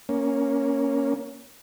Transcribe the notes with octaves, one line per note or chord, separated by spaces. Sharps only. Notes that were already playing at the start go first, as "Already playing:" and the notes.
A#3 C#4